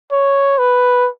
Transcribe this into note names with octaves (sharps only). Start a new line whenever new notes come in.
C#5
B4